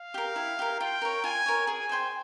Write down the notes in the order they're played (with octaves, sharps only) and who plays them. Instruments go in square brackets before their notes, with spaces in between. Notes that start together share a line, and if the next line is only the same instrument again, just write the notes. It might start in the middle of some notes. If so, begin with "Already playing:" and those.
Already playing: [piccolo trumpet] F5
[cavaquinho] G4 A#4
E4
G4 A#4
[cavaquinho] F4 [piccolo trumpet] G5
[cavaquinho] A#4 C#5
[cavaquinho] F4 [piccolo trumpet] G#5
[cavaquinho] A#4 C#5
[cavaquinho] G#4 [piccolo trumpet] G#5
[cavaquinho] C5 G5 C6